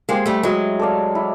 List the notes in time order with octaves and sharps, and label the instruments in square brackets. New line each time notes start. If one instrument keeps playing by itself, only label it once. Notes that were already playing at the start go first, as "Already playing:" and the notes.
[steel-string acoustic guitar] G#3 A#3 [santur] G4 C5 F5
[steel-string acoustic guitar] G3 A3
[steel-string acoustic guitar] F#3 G#3 [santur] E4
[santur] A4 D5 F5
E4